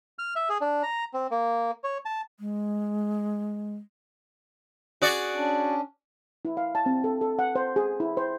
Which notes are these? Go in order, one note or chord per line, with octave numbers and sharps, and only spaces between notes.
F6
E5
G#4
D4
A#5
C4
A#3
C#5
A5
G#3
F#4 G#4 D5
C#4 D4
E4
F5
A5
C4
A4
A4
F#5
C5
G#4
E4
C5